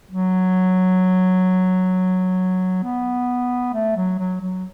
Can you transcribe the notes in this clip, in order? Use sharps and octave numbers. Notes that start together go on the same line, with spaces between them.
F#3
B3
A3
F#3
F#3
F#3